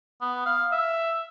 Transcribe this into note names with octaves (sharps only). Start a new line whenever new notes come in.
B3
F5
E5